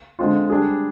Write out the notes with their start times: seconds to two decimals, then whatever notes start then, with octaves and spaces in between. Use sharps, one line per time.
0.19 D3 G#3 C4 F4
0.50 G3 D4 G#4